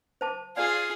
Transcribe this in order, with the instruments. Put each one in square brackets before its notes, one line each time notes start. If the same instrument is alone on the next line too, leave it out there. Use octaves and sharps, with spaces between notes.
[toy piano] C5 A5 D6
[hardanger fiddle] F4 G#4 [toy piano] D5 [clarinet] F5